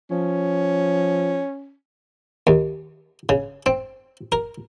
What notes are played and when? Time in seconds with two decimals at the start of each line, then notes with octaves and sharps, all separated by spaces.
0.10 F3 C#4
2.47 D#2
3.29 C#3
3.66 C4
4.32 A#4